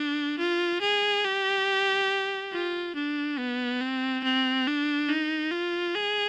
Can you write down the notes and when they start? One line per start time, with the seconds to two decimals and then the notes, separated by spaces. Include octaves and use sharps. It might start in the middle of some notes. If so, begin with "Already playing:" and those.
Already playing: D4
0.39 F4
0.81 G#4
1.25 G4
2.52 F4
2.95 D4
3.38 B3
3.81 C4
4.24 C4
4.67 D4
5.09 D#4
5.51 F4
5.95 G#4